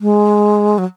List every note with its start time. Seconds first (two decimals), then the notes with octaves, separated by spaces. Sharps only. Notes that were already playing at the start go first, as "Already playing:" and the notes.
0.01 G#3
0.78 F#3